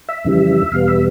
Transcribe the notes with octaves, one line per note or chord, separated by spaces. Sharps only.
E5
F2 C#3 E3 G3
E2 B2 G3 B3 F5
E5